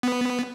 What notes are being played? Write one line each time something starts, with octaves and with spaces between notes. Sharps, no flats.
B3